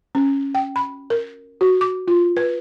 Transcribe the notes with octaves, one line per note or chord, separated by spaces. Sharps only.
C#4
G5
B5
A#4
F#4
D6
F4
B4